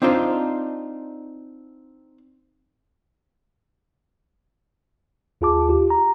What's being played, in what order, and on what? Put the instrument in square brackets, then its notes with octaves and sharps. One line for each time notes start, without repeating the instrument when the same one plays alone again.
[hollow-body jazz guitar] C4 D4 D#4 F4 C5
[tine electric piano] D#2 F4 G#4 A5 D6
F4 G4
A#5